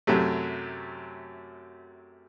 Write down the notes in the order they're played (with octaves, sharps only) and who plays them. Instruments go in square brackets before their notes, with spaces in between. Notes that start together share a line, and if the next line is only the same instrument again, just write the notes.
[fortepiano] F#2 C3 F#3 A3